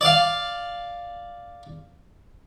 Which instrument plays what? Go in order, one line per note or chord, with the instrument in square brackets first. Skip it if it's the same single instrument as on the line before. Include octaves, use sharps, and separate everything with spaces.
[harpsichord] D5 F5